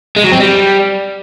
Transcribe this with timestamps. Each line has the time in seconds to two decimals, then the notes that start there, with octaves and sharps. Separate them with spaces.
0.16 G#3
0.24 F#3
0.32 C4
0.40 G3